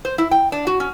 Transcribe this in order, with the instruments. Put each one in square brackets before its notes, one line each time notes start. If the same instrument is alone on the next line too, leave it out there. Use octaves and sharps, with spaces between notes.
[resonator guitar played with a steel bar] C5
E4
G5
D4
F#4
C#4